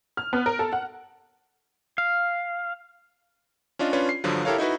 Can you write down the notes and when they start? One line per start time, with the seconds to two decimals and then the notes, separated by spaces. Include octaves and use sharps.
0.17 F6
0.33 B3
0.46 A#4
0.59 A4
0.73 F#5
1.98 F5
3.79 C#4 D4 F4 D#5
3.93 C#4 D4 F4 B4 C#5
4.09 C7
4.24 G2 D3 F3 F#3
4.45 E4 G4 A4 A#4 C#5 F5
4.58 D#4 E4 F#4 B4